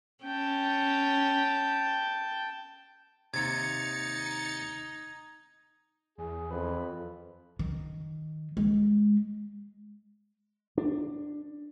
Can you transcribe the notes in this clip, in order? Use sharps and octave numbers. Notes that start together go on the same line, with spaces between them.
C#4 G5 A5
D#2 C3 D#4 G#6 A6 C#7
E2 G#4
F2 B4
D#3
G#3
D4